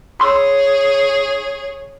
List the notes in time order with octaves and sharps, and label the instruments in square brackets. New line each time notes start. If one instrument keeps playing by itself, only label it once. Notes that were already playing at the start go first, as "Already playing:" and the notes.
[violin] G#4 C#5 [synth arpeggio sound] B5 C6 E6